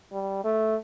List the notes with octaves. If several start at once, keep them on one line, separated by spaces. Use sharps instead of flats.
G3
A3